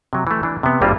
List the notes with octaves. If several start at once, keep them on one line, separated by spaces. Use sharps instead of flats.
C3 F#3
E3 A3
E3 D4
C3 B3
G#1 G2 G3 A#3 C4 F4